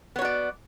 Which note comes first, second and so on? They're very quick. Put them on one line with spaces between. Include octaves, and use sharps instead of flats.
B3 C#5 F#4 D5